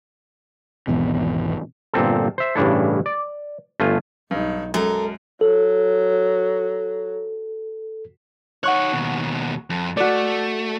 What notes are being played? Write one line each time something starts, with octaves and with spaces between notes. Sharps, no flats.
G#1 E2 B2
G1 A#2 C4 A4
C5 E5
A1 G2 C#3 D4 E4 A4
D5
G1 A3 F4 G#5 A5
B1 G2 D#4
F#2 G#3 A4 A#4
F#3 A4
D#4 C#5 F#5 C#6 F#6
D#2 B2
F2
A3 F#4 D5